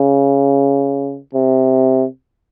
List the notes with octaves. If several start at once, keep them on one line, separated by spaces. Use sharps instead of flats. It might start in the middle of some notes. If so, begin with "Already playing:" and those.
Already playing: C#3
C3